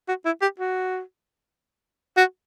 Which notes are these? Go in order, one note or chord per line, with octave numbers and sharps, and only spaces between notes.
F#4
E4
G4
F#4
F#4